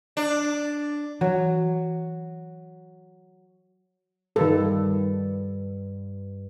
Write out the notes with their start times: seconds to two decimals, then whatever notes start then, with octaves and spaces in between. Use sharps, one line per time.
0.17 D4
1.21 E3 F#3
4.36 G2 D#3 A4